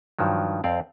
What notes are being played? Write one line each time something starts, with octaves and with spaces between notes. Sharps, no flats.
G2 D#3 F3 F#3
F2 C4 D5 F5